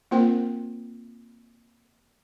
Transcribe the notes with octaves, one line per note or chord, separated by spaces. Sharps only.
A#3 C4 F4 A#4 C5 G5